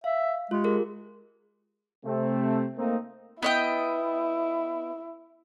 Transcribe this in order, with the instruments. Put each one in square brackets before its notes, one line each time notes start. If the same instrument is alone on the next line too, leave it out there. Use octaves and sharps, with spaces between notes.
[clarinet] E5 [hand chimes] F5
[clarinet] G#3 [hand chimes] F4 G4
[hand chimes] G#4 A#4
[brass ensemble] C3 A3 C4
A3 A#3 C4 D#4
[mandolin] B3 D#5 G5 [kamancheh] E4